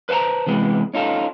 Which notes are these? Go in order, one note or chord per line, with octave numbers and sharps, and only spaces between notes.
B4 C5 E5 A5 A#5
C3 E3 G#3 B3
C#4 D#4 F4 A4